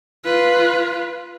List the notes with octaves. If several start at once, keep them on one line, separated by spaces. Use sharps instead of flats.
F4 B4